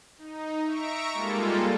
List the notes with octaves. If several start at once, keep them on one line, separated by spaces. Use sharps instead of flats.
D#4
E5 A#5 C#6 D7
G3 G#3 A#3 F4 A4